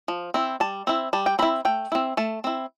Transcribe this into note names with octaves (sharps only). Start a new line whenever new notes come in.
F3
C4 E4
G3 A5
C4 E4
G3 A5
G5
C4 E4 B5
A3 G5
C4 E4
A3 A5
C4 E4